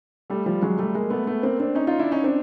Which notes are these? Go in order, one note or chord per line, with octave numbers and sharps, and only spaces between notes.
G3 A3
F3 G3
F#3 G#3
G3 A3
G#3 A#3
A3 B3
A3 B3
A#3 C4
C4 D4
C#4 D#4
D#4 F4
D4 E4
C#4 D#4
C4 D4